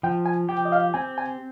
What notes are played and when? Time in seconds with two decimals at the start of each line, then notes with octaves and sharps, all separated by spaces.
0.03 F3 G5
0.26 G#5
0.49 G4 G5
0.65 D#5
0.72 F5
0.94 C4 G#5
1.18 G#5